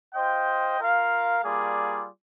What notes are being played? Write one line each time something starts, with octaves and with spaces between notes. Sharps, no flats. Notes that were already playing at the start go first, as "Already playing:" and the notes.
F4 C5 D#5 G5
F4 A#4 F5
G3 A#3 F4 G#4 D5